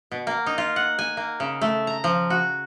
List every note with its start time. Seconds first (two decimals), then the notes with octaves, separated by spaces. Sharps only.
0.11 B2
0.27 A#3
0.46 D#4
0.58 F4
0.76 F#5
0.99 G#5
1.17 A#3
1.40 C#3
1.61 A3
1.87 A#5
2.04 F3
2.30 F#4